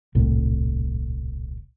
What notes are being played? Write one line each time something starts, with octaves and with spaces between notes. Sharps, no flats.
D#1 C2 A2